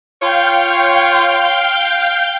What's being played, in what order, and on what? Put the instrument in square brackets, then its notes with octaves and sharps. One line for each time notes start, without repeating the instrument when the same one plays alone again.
[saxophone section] F4 C#5 [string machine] F5 G5 G6